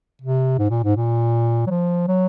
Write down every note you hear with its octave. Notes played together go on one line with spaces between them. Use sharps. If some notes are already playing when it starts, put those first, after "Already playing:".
C3
G#2
A#2
G#2
A#2
F#3
F3
F#3